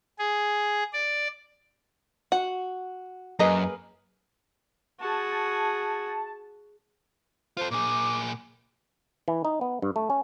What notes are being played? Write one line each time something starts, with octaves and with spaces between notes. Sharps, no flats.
G#4
D5
F#4 F#5
F#2 A#3 G#4 B4 D#5 A#5
F#4 G#4 A5
F4 A4 C5
A#2 G#4 D6
E3
D#4
B3
G2
A3
C#4